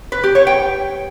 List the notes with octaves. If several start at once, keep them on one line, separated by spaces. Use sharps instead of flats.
B4
G4
C#5
G5